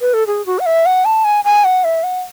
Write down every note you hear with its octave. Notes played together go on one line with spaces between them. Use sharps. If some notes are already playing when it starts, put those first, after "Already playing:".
B4
A4
G#4
F#4
F#5
E5
F#5
A5
G#5
G#5
F#5
E5
F#5